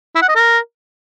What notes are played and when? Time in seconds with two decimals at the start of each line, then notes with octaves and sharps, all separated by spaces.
0.15 E4
0.22 F#5
0.28 D#5
0.35 A#4